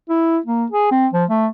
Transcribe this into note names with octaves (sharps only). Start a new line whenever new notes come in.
E4
A#3
G#4
C4
F3
A3